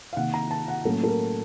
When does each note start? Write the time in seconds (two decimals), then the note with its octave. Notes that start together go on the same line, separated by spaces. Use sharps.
0.13 F5
0.17 C3 D#3 A#3 F#5
0.34 A#5
0.51 A5
0.68 F#5
0.85 A2 F#3 A#3 C#4 A4
1.03 A4
1.08 A#4